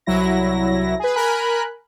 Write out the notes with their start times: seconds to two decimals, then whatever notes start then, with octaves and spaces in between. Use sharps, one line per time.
0.06 C2 F#3 E4 A#6
0.99 G#4 B4
1.15 A#4 G#5 B5 F#6